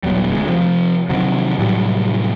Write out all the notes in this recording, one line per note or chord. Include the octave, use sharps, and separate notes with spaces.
D#1 B2 F#3 G3
D2 G#3
C3 F3 C4
C3 D#3 F3 F#3
A2 C3 F#3 G3